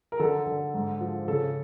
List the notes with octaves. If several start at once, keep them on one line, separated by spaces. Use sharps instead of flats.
A#4
D3 A4
D3
G#2
F3
C#3 A4